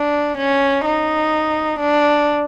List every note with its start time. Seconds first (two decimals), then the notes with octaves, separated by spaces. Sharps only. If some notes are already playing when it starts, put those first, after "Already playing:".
Already playing: D4
0.38 C#4
0.85 D#4
1.80 D4